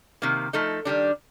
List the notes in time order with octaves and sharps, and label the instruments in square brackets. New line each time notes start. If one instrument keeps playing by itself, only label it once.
[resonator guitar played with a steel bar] C3 D#3 A#3
F3 A3 D#4 A4
D#3 G3 D4